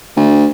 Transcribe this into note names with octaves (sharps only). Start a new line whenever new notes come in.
D2